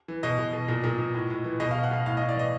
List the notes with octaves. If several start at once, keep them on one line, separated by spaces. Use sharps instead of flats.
E3
B2 D#5
B2
B2
A#2
A#2
A#2
A2
A2
E3
B2 D#5
F5
B2
F#5
B2 F5
A2 F5
D#5
A2
D5
E3 D#5